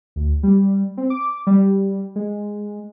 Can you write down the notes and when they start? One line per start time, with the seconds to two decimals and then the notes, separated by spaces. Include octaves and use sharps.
0.16 D2
0.43 G3
0.97 C4
1.10 D6
1.47 G3
2.16 G#3